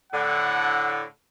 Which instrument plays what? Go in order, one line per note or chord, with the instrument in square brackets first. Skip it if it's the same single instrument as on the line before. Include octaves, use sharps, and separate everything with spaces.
[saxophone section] A2 D3 [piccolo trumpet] F#5